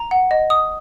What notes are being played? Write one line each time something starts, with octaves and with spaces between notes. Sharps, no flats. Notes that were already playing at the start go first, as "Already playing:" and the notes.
Already playing: A#5
F#5
D#5
D#6